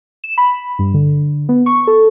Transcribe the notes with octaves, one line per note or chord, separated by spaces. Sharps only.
E7
B5
G2
D3
B3
C#6
A4